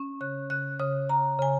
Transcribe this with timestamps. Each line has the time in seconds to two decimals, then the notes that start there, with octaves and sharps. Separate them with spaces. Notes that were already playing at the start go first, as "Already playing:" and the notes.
Already playing: C#4
0.21 C#3 F#6
0.50 C#3 F#6
0.80 C#3 D#6
1.09 C#3 A#5
1.39 C#3 G#5